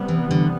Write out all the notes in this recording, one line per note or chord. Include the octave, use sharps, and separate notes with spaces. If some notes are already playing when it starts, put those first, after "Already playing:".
Already playing: C3 G3 B3
E3
D3